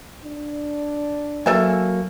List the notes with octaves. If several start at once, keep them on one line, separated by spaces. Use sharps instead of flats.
D4
F#3 A#3 A4 E5 G#5